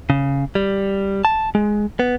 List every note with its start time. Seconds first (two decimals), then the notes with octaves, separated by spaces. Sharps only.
0.10 C#3
0.55 G3
1.25 A5
1.55 G#3
2.00 B3